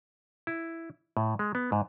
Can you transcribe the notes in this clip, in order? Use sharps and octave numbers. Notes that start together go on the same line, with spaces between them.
E4
A2
G#3
B3
G#2